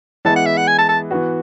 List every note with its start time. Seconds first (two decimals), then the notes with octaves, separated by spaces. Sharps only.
0.25 E3 G#3 B3 E4 A5
0.36 F#5
0.46 E5
0.57 F#5
0.68 G#5
0.79 A5
0.89 A5
1.11 E3 B3 F#4